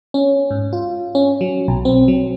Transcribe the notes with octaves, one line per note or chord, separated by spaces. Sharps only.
C#4
G#2
F4
C#4
F#3
B1
C4
F#3